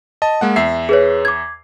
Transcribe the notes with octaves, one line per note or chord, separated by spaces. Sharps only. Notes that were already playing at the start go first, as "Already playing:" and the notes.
D#5 A5
G#3 A#3 F#5
E2 E5 C7
G#4 B4 C#5
D6 G#6